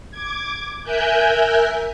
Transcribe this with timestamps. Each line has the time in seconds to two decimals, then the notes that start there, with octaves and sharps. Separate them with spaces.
0.11 D6 G#6
0.83 A#4 E5 G#5 F#6 G6